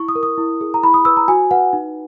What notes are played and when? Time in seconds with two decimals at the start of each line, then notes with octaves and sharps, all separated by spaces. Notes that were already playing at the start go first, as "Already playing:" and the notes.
Already playing: E4 C#6
0.09 D#6
0.15 A#4
0.23 D#6
0.37 E4
0.61 G#4
0.74 A#5
0.83 E4 B5
0.94 D#6
1.05 B4 E6
1.17 A#5
1.28 F#4 G#5
1.51 B4 F#5
1.73 D#4